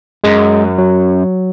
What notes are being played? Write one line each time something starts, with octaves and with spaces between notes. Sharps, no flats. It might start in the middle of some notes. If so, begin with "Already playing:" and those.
F#2 G#3
F#3